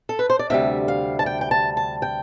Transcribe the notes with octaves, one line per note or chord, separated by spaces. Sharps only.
A4
B4
C5
D5
D2 C3 G3 E5
F5
A5
G5
G5
A5
A5
G5